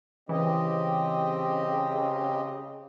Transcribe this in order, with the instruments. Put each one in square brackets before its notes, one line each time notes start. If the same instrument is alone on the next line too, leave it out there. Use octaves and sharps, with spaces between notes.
[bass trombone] C#3 [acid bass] E3 [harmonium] C4 G4 D#5